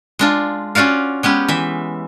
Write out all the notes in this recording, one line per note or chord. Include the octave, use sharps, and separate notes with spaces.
G#3 D4 F4
C#4 F4 F#4 D5 F5
G#3 B3 C#4 G4
E3 E5